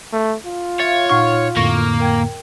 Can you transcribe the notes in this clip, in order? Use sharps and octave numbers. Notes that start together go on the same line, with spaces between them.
A3
F4
C#5 E5 F5 A6
A#2 D#4 F5 F#5 C#6 F6
F2 A2 D3 A#3 C#6 A#6 C#7
A#4 G5 G#6